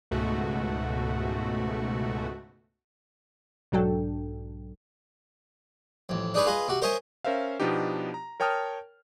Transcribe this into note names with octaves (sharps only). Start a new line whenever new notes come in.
C#2 G#2 B2 A3 F#4
B1 G#2 F#3 D4 A4 G5
A1 F2
D4 D#4 G#4 B4 C#5
F4 G#4 B4 D#5
C3 F#4
A#4 C5 C#5 D#5 E5 G#5
C#4 A#4 C5 E5 F5
B2 F3 B3 D4 D#4 G4
A#5
A#4 C#5 G5 A5 D#6 F6